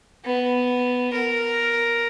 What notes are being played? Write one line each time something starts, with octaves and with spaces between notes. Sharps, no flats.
B3
A#4